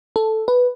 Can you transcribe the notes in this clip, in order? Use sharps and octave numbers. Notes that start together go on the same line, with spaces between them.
A4
B4